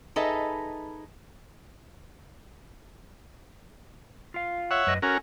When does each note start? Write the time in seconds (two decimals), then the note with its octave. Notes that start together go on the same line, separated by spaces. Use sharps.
0.16 D#4 G#4 A4 B4 D#5 E5
4.34 F4 F5
4.71 C#5 E5 F#5
4.87 F#2 B4 D#5
5.02 C#4 F#4 A4 A#4 G#5